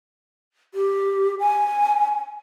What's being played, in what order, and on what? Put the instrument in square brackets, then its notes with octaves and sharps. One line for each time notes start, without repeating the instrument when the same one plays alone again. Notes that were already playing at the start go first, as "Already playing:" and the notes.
[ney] G4
G#5